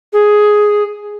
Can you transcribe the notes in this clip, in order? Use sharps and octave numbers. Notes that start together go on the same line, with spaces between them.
G#4